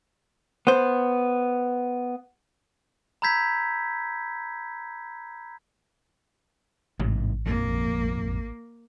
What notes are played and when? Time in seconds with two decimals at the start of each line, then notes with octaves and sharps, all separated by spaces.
0.67 B3 C5
3.22 A#5 B5 E6 G6 G#6 B6
7.00 A1 G#2 C3 E3
7.46 A#1 F2 G#2 A#3